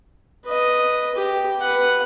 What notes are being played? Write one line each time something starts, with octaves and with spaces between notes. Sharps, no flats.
B4 D#5
G4
B4 F#5